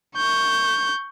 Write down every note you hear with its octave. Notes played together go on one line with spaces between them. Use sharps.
C#6 G6